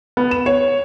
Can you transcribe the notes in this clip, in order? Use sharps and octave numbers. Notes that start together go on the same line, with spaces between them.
B3
E7
C#5